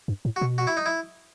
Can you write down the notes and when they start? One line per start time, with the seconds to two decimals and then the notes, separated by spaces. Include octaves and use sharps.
0.08 G2
0.25 A2
0.36 F#4
0.41 B2
0.58 F#4
0.67 E4
0.77 D#4
0.86 E4